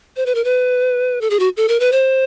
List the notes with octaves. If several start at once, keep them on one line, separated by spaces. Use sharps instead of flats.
C5
B4
A#4
B4
A4
G#4
F#4
A4
A#4
B4
C5